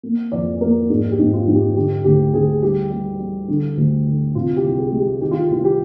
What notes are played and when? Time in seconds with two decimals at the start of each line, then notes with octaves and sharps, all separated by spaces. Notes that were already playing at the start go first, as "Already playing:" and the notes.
0.03 A#3
0.32 F2 D5
0.61 A#3 A#4
0.89 G#2 G#4
1.11 G4
1.19 G#2
1.33 F4
1.48 G#2
1.54 G4
1.76 D3 G4
2.04 D2 G4
2.34 D2 G#4
2.62 G3 G4
2.90 G3
3.20 G3
3.48 D3
3.77 D2
4.06 D3
4.35 C3 F4
4.56 G4
4.64 C2
4.78 G#4
4.92 G#3
5.00 G4
5.21 D#3 G4
5.31 F4
5.50 C2 F4
5.64 G4